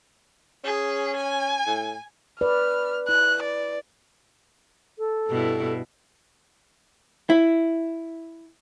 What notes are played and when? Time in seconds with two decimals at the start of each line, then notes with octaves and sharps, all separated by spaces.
0.64 C#4 G#4
1.16 G#5
1.67 A2
2.41 B4 D5 F6
3.09 E4 F#6
3.43 D5
4.99 A4
5.28 G2 B2 E4
7.30 E4